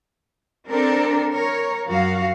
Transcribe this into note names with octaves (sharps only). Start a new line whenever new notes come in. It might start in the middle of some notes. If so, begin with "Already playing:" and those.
C4 D4 A4 A#4
A#4 C#5
F#2 F#4 F5